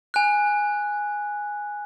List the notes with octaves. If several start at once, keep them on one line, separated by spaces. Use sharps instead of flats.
G#5 F#6